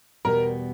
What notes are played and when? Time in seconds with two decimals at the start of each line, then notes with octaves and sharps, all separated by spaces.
0.25 E2 B2 G3 B3 A#4